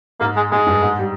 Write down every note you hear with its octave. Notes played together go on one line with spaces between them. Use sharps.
G#2 A#3
G#3
G#2 G#3
G2
G#2
G3